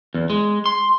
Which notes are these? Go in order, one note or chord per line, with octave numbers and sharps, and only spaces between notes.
E2
G#3
C6